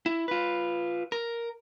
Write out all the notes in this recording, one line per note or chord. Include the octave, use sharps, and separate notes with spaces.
E4
F4 B4
A#4